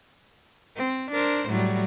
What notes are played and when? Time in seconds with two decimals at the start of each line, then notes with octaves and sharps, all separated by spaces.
0.77 C4
1.11 D4 A#4 C5
1.49 A2 F#3 G3